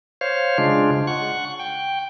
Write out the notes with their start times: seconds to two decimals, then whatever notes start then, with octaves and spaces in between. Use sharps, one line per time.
0.21 C5 C#5 F5
0.58 C#3 G#3 D4 F4
1.07 F#5 C#6
1.59 G5